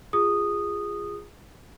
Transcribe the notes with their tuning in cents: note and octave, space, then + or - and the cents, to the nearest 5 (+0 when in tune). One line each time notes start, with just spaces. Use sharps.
F4 +0 G#4 -15 D#6 -10